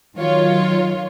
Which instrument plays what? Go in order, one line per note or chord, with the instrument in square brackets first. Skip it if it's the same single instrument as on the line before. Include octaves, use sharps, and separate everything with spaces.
[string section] D#3 F#3 F4 C#5